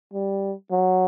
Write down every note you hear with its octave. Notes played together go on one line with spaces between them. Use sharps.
G3
F#3